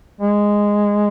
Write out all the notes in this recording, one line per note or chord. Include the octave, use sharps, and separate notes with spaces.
G#3